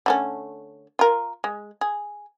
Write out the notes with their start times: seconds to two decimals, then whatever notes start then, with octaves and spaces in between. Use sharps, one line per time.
0.06 D3 A3 C#4
0.99 F4 A#4
1.44 G#3
1.81 G#4